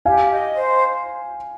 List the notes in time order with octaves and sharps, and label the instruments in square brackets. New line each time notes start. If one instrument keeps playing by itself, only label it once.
[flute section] G4 [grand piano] F5 G#5
[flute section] D#5
C5